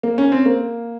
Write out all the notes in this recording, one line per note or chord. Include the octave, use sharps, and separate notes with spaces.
A#3
C#4
C4
A#3